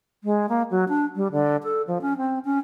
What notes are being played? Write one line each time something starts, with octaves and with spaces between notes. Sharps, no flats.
G#3
A#3
F#3
D4
G3
D3
A4
F3
C#4
C4
C#4